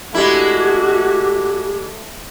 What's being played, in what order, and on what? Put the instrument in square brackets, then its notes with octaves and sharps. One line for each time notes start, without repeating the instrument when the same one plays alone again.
[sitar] G#3 D4 E4 [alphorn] A3 [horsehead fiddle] F#4 [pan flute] G4